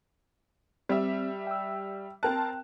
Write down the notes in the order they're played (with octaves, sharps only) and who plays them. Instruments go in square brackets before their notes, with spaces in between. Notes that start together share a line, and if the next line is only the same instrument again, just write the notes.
[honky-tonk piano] G3 E5 [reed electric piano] C4
[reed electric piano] G5 E6
[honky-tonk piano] C4 A#4 A5 [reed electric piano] G5 F#6